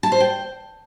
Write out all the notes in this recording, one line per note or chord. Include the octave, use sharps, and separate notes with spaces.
A5
C5
G5